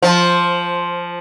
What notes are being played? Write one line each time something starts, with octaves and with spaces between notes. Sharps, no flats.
F3